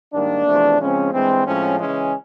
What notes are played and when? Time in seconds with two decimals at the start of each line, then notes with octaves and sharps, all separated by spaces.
0.13 G#2 D#3 G3 A#3 D4
0.46 E2 C3 F3 A3 C4
0.80 C#3 F3 G#3 C4 C#4
1.13 G2 E3 G#3 C4
1.46 A2 F3 G#3 C4 C#4
1.79 C#3 E3 G#3 C#4